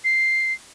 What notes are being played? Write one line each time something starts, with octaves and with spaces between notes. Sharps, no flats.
C7